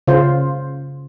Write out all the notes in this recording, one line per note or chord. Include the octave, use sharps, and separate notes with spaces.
C#3 F4 C5